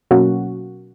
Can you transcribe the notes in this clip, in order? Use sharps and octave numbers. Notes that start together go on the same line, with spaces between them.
B2 F#3 A#3 C#4 F#4